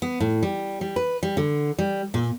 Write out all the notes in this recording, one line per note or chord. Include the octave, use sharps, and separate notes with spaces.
B3
A2
G3
G3
B4
G3
D3
G3
A#2